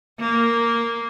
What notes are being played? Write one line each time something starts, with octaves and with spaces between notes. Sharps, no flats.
A#3